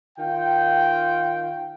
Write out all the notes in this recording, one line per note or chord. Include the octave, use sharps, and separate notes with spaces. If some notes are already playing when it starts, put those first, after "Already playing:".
D#3 F4 F5 G5